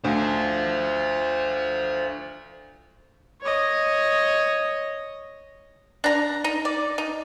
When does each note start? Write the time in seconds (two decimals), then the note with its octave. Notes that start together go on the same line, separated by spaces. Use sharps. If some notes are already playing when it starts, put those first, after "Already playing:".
0.04 D2 C5 F5
3.41 C#5 D#5
6.04 D4 A#5
6.44 D#4
6.65 D5
6.98 D#4